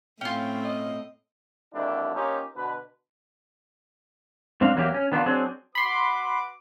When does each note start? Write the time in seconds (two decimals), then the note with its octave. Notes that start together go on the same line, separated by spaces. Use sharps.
0.21 A2 C4 C#4 F4 G5
0.64 D#5
1.74 G#1 D#2 D3 D4 E4 G4
2.15 A#3 C#4 D#4 F4 G4
2.56 B2 D3 B4
4.61 G#2 C4 D4 F5
4.76 E2 F#3 A#3 E4 G4
4.94 C#4
5.12 D#3 B3 D4 F4
5.26 F#3 C4 D4 G#4
5.75 F#4 B4 B5 C6 D6